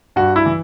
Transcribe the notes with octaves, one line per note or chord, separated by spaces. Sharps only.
G2 F#4
E4
E3